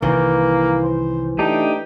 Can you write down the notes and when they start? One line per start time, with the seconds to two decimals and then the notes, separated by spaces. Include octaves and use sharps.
0.02 C2 D#3 E3 A#3
0.84 C5
1.39 A3 D4 D#4 G4